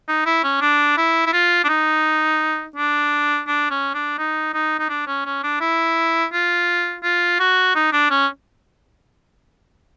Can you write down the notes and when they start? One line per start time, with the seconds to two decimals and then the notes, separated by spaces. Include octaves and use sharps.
0.08 D#4
0.26 E4
0.44 C#4
0.61 D4
0.97 E4
1.26 E4
1.33 F4
1.64 D4
1.69 D#4
2.76 D4
3.47 D4
3.71 C#4
3.94 D4
4.18 D#4
4.54 D#4
4.79 D#4
4.90 D4
5.07 C#4
5.26 C#4
5.43 D4
5.61 E4
6.33 F4
7.03 F4
7.39 F#4
7.75 D#4
7.93 D4
8.11 C#4